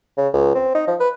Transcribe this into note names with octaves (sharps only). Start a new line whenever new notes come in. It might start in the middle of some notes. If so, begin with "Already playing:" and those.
C#3
C#2
C4
D#4
F3
B4